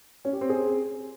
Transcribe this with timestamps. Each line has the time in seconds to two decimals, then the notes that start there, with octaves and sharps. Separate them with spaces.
0.25 C#4
0.33 G4
0.41 C4
0.49 G#4